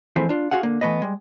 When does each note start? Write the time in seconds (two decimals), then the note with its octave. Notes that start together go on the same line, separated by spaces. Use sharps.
0.16 E3 F3 G#3 A3 C4 E4
0.29 D4 F4
0.51 F4 F#4 G#4 F5 F#5
0.63 D3 A#3
0.81 E3 A3 B3 B4 D#5
1.02 G3 G#3